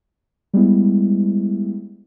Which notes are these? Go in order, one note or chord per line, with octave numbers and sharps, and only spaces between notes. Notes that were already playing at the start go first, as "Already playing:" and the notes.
G3 G#3 B3 E4